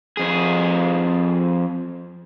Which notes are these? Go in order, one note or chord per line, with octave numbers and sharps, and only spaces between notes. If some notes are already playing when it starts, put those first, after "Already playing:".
F2 G#4